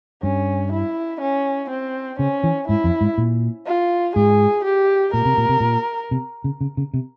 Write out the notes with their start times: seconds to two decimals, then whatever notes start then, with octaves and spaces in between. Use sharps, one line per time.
0.23 G2 C#4
0.72 E4
1.21 C#4
1.70 C4
2.19 C#3 C#4
2.44 E3
2.68 G#2 E4
2.84 F2
3.01 G#2
3.18 A#2
3.66 F4
4.16 G#2 G#4
4.65 G4
5.14 A#2 A#4
5.25 C3
5.38 A#2
5.49 C3
5.60 A#2
6.11 C3
6.44 C#3
6.61 C#3
6.77 C#3
6.94 C3